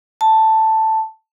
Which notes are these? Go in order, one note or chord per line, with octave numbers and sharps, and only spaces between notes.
A5